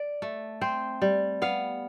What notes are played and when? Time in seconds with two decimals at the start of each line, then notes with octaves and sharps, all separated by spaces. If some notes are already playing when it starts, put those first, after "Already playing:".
Already playing: D5
0.22 A3
0.61 C4 C5
1.02 G3
1.42 B3 F5